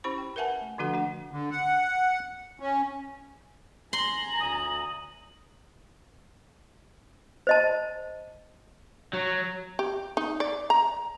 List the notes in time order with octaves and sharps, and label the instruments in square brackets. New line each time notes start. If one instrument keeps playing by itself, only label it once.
[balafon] C#4 E4 G4 C5 B5
G5
A#4 B4 E5 F#5 G#5 A5
A3
D3 F3 D4 F#4 A4 F#5
A3 D4 F#5
[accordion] D3
F#5
C#4
[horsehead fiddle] G#5 A#5 [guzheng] C6 [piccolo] F#7
[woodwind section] D2 D#6
[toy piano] C5 D#5 A5
[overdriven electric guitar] F#3
[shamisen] G4
D#4
D5
A#5